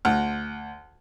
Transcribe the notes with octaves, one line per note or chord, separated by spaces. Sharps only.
D2